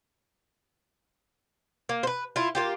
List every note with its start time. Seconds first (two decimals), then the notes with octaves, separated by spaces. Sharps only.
1.89 A#3
2.03 B4 C5
2.36 E4 F4
2.55 A#3 F4 G4